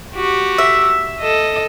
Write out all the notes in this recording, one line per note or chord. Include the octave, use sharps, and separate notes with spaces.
F#4 G4
E5
A4 D#5